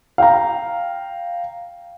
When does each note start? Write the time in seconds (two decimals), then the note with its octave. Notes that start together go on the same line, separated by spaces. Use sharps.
0.18 F5 G5 A#5